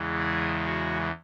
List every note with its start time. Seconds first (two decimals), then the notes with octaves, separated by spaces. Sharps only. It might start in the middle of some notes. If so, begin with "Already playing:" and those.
Already playing: E2 C#3 E3 G#3
0.18 G#4
0.65 F#4